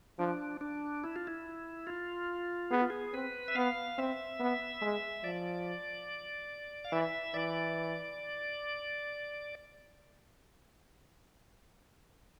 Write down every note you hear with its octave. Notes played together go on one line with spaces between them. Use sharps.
F3 D4
D4
E4
F4
E4
F4
B3 G#4
F4
G#4
C4 B4
E5
B3 F5
C4 E5
B3
G#3
F3 D5
F5
E3 E5
E3 D5